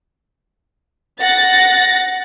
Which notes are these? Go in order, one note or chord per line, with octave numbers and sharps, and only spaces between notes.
F#5 A6 A#6